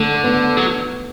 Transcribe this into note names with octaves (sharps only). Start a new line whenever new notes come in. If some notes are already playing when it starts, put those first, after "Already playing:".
Already playing: D3 A3
B3
F#3